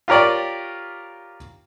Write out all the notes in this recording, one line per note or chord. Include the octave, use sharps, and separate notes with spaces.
F4 G4 A#4 C#5 D5